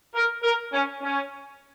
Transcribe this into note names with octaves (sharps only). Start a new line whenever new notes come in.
A#4
A#4
C#4
C#4